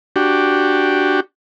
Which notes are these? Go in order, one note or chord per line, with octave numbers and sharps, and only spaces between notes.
D4 F#4 G4